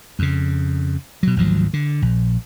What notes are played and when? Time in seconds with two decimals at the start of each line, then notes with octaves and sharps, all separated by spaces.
0.19 F2 C#3
1.23 B2 F#3
1.36 G#1 D2 F3 F#3
1.73 D3
2.02 A#1